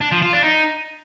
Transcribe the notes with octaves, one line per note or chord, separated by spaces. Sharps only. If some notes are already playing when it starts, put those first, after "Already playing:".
D4
F3
F4
D4
D#4